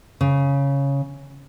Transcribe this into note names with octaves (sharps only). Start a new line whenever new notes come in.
C#3